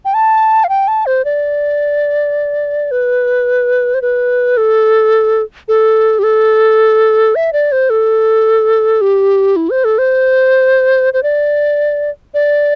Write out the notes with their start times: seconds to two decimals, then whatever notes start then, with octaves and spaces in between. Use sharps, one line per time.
0.05 G5
0.14 A5
0.64 F5
0.69 G5
0.88 A5
1.06 C5
1.25 D5
2.91 B4
3.94 C5
4.02 B4
4.57 A4
5.68 A4
6.19 G4
6.23 A4
7.35 E5
7.53 D5
7.72 C5
7.90 A4
9.01 G4
9.56 E4
9.70 C5
9.84 A4
9.98 C5
11.13 C5
11.23 D5
12.34 D5